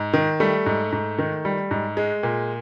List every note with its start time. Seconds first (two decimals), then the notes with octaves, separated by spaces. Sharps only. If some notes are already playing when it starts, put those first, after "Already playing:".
Already playing: G#2
0.13 D#3
0.40 G3 A3
0.66 G#2
0.92 G#2
1.18 D#3
1.45 G3
1.71 G#2
1.97 G#3
2.23 A#2